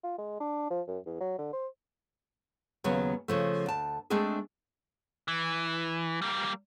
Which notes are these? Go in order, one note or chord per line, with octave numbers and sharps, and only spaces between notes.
F4
G#3
D4
F3
F#2
E2
F#3
D3
C5
D#2 C#3 F#3 B3
C#3 F3 A3
D2 A5
G#3 A3 C4 D4 G#4
E3
G3 A#3